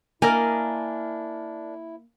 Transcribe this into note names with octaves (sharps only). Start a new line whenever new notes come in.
A#3 D4 E4 A#4 D#5 G#5 F6